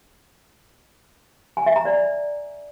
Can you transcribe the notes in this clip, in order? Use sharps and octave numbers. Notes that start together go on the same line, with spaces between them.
G#5
E5
A#5
D5